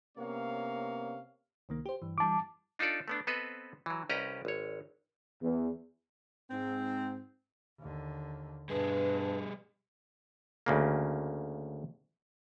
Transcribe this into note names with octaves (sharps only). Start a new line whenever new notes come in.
C3 A#3 B3 C#4 C#5 F5
C2 D#3 A#3
G4 C5
G2 E3
E3 G3 A5 D6
D4 D#4 F4 A4 D5
A3 B3 D4
B3 C4 A4 B4 C5 D#5
E3 F#3
C2 C#4 G4 B4 D#5 A#5
G#1 C#5
E2
G#2 C4
D#2 D3
G2 B2 G3 G#4 B4
D2 C#3 A#3